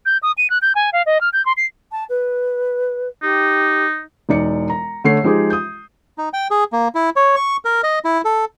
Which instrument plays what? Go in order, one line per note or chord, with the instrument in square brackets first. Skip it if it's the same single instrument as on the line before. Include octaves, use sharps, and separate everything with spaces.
[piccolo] G6
D#6
D#7
F#6
G6
G#5
F5
D#5
F6
G6
C6
C7
[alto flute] A5
B4
[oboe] D#4 [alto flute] G4
[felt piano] E1 D#4 D5 C#7
A#5
D3 A3 C#5 C7
F3 G#3 D#4 G4 G#4
D#6 G6
[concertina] D#4
G5
G#4
A#3
E4
C#5
C#6
A#4
D#5
E4
A4